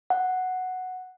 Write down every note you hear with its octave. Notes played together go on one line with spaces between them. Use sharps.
F#5